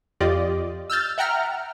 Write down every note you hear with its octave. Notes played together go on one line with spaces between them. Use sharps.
F2 F4 G4 D5 D#5
E6 F6 G6 A6
E5 F#5 G5 A#5 F6